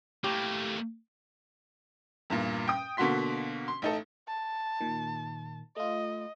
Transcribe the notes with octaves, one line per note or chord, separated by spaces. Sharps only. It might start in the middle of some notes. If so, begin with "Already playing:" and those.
A2 A3 A#3 G4
E2 G2 A#2
G5 D#6
B2 D3 A#3 F#4 C6 B6
C6
A1 D#4 A4
A5
A#2 D#3
A3 F4 D#5